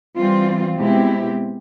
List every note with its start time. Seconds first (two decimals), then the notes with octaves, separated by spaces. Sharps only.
0.15 E3 G3 C4 F4
0.76 B2 G#3 C4 E4 G4